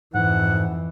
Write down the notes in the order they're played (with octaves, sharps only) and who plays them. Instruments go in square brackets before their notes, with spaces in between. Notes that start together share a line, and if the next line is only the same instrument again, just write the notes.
[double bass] F2 E3 [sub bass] G#2 [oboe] F#5